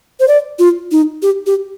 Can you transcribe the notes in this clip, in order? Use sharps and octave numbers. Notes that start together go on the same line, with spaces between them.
C5
D5
F4
D#4
G4
G4